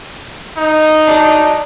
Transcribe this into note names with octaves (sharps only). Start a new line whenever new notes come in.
D#4
F#3 G3 D4